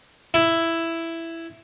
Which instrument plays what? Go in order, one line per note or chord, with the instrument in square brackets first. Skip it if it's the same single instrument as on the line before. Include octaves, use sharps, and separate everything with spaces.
[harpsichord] E4